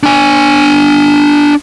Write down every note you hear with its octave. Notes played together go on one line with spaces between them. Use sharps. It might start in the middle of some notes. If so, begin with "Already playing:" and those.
D4 G#5